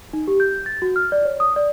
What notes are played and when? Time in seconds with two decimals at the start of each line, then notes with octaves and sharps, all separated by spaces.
0.13 D#4
0.27 G4
0.40 G6
0.66 A6
0.82 F#4
0.96 F6
1.12 D5
1.25 C#5
1.40 D#6
1.56 D5